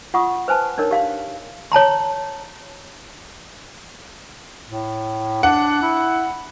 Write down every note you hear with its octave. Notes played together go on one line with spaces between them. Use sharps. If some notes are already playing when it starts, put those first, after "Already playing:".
F4 F#5 C#6 D#6
B4 C5 G#5 A5
D4 D#4 A#4 C#5
G4 F5 C6
C#5 A5 A#5 C6
A2
D4 F#5
E4